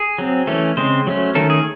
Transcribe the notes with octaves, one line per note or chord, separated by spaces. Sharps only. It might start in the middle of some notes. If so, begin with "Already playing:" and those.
Already playing: G#4
F#3 C4
E3 A3 C#4 A4
C#3 G#3 C4 C5
F#3 A3 C#4
D#3 A3 C#4 A4
G#4